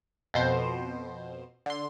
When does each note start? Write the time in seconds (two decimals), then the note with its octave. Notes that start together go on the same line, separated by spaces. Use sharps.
0.34 F2 B2 C5
1.66 D3 C6